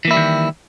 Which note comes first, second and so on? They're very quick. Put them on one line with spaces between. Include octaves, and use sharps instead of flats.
E3 A#3 E4 G3 D#3